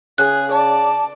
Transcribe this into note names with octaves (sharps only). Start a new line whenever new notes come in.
C#3 G#4 F#6
D5 A5